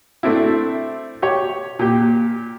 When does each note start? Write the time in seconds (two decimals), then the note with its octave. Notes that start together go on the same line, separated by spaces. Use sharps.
0.23 A3 C4 D4 E4
1.22 G4 C#5
1.79 A#2 G4